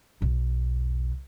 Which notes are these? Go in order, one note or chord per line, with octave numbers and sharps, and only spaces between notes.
B1 E2